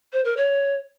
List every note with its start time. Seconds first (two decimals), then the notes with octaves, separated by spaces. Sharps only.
0.13 C5
0.25 A#4
0.37 C#5